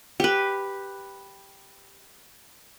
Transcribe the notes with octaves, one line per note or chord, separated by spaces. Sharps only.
G4 B4